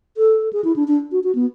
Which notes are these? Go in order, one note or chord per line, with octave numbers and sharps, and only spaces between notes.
A4
G#4
E4
D4
D4
F#4
F#4
B3